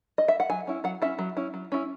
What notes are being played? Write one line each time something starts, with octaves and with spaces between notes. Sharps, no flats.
D#5
E5
F#5
F#3 G#5
C#4 E4
F#3 F#5
C#4 E4 E5
F#3
C#4 E4
F#3
C#4 E4